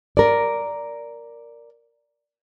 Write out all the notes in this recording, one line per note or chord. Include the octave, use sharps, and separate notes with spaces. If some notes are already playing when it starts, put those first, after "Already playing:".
A#4 D5